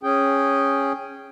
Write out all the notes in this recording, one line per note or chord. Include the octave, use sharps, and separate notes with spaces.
C#4 G#4 G5